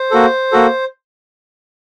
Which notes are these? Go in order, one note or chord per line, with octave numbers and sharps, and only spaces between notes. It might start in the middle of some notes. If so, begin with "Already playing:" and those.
Already playing: C5
A#3 F#4 A4
A#3 F#4 A4